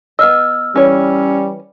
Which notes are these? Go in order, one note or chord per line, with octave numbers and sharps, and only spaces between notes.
B3 D#5 E6 F6
E3 G3 C#4 C#5